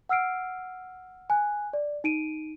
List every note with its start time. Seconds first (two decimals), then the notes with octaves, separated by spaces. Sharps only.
0.09 F#5 E6 F6 C7 D7
1.30 G#5 F#6
1.73 D5
2.04 D#4 D7 D#7